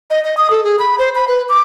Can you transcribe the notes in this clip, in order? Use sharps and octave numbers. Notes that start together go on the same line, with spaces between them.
D#5
D#5
D#6
A4
G#4
B5
C5
B5
B4
D6